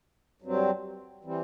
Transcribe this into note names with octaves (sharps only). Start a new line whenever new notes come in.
G2 F#3 C4
E3 G3 C4